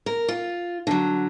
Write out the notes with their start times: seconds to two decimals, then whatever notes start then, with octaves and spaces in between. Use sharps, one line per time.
0.06 A#4
0.28 F4
0.87 D3 F#3